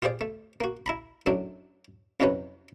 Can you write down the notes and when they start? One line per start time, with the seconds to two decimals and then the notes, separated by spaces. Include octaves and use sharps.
0.02 F4 G4 G#4 C5 D5
0.21 A3
0.61 A#3 F#4
0.86 E4 A#5 B5
1.26 F#2 A2 F#3 D4
2.20 C2 F2 C3 F#3 C#4 B4